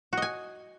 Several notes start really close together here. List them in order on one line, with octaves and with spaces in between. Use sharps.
F#4 D#5 G#5